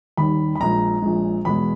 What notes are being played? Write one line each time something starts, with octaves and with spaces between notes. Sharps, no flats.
D#2 D#3 G3 B5
B5
A#1 A#2 G#3 A#5
A#1 A#2 G#3
E2 B2 G#3 B5